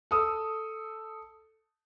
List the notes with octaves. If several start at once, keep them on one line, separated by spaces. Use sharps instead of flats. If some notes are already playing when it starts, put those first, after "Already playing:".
A4 D#6 E6